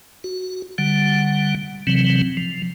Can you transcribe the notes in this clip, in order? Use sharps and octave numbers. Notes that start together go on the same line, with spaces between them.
F#4
D3 G3 F#5
C3 E3 F#3 C4
F3